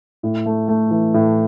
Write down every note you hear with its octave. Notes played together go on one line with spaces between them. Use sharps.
A2
A3
A3
E3
A2